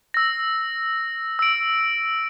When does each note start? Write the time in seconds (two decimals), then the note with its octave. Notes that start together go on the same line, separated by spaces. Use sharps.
0.14 E6 A#6
1.39 E6 D7